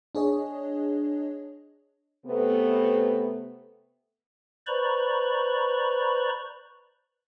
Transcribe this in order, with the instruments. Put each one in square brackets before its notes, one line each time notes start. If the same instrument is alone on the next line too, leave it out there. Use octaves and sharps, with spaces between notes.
[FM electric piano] D4 G#4 C#5 D#5
[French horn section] C3 A3 B3
[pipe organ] B4 C5 D5 A#5 B5 C#6